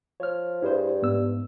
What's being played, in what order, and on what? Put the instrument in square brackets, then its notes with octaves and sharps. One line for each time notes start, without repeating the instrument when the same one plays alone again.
[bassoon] F3 [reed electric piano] C#5 F6
[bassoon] G2 [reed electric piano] E4 G#4 C5
[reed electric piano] G#2 B3 E6